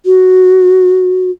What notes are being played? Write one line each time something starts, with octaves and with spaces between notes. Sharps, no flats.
F#4